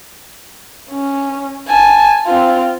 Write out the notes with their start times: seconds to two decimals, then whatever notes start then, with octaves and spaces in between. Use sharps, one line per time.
0.90 C#4
1.68 G#5 A5
2.27 C4 F4